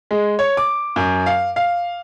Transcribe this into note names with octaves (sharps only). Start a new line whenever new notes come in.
G#3
C#5
D6
F#2
F5
F5